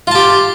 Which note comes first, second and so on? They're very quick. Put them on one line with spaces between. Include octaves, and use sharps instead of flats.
F4 A5 G4